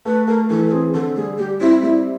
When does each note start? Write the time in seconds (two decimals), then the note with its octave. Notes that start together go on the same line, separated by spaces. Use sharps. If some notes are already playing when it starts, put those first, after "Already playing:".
0.05 A3 B4
0.27 A3 A#4
0.49 E3 A4
0.66 A4
0.72 C4 G#4
0.94 D3 A4
1.16 G3 G#4
1.38 G3 G4
1.60 C4 E4
1.82 G3 E4